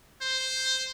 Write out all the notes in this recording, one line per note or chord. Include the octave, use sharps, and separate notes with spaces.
C5